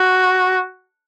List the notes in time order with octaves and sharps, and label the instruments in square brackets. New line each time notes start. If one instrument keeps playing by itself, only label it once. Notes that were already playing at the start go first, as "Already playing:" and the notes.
Already playing: [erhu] F#4